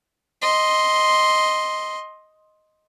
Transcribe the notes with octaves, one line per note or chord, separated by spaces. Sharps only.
D#5 C6